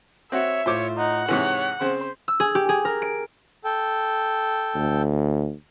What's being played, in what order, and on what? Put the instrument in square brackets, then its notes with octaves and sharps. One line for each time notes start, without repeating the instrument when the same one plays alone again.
[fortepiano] C4 F#4 [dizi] C#5 [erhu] E5
[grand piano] A2 F4 [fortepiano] C5 D6 [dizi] C#5
[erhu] D#4 [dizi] F#5
[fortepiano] G#2 C3 E3 [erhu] C#5 [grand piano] F#7
[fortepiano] C#3 C4 [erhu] C5
[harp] E6
G#4
G4
G#4
A#4
D7
[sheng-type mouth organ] A4 G5
[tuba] D2